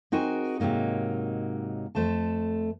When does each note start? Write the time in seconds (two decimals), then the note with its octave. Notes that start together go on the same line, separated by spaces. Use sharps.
0.12 C4 D#4 F#4 G#4 A#4 G#5
0.60 G#2 C3 F#3 A#3 D#4
1.95 F2 A3 C5 A5